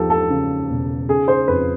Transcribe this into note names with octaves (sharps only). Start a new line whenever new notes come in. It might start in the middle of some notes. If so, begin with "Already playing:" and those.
Already playing: E2 F3 G4 A4
A4
C#3
E1
C#3 G#4
C5
F2 B4